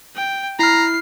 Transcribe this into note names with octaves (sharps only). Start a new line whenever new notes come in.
G5
E4 A#5 F6 C7